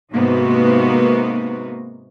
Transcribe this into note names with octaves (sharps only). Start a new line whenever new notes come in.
G#2 C3 A#3 B3 D#4 F#4